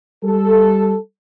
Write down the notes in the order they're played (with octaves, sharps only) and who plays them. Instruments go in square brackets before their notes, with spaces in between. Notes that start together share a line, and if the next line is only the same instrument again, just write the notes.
[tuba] G3 [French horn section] A4